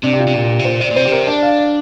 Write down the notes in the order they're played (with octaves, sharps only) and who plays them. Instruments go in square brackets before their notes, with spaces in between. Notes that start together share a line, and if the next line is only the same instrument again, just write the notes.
[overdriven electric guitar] C3 [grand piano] D4
[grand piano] G4
F4
[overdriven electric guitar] C3
[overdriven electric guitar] A#2 [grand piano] G4
[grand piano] G4
[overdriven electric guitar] C3
[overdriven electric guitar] A#2 [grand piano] C5
[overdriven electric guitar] C3 [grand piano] D5
[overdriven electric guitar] A#2
[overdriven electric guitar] C3 [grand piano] C5
[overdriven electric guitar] D3 [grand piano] G4
[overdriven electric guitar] C3 [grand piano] A#4
[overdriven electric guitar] D4 [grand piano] D5
[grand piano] F5
D5